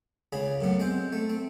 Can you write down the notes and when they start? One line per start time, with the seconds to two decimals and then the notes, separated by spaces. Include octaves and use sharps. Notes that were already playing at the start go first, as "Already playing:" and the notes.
0.33 C#2 C#3 G#4 B5
0.61 F#2 A2 B3
0.79 G#3 C4 C5
1.13 A3
1.30 C4